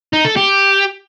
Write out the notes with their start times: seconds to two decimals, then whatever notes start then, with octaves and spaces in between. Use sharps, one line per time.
0.13 D#4
0.25 A4
0.36 G4